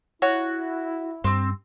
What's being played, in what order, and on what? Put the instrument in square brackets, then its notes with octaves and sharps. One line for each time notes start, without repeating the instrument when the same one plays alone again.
[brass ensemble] E4 [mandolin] F#4 [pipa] C#5
[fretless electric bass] G2 [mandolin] C4 E6